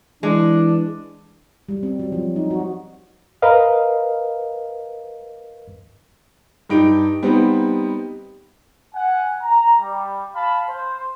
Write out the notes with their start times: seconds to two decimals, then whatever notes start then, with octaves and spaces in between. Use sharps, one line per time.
0.23 E3 G#3 D4
1.69 G3
1.83 C4
1.99 F#3
2.12 F3
2.36 D#4
2.50 F#4
3.42 A#4 B4 D#5 F5
6.69 G2 D#4 G4 D7
7.23 G3 B3 C4 D#4
8.94 F#5 G#5
9.41 A#5
9.80 G3
10.34 F5 A5 B5
10.67 C5